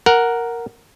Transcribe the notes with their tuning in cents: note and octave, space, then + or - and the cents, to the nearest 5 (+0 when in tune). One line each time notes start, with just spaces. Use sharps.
A#4 +0 F#5 +0